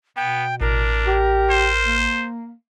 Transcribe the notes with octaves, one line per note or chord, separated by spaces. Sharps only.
B2 B3 G5
A1 D4 A#4
G4
C5
A#3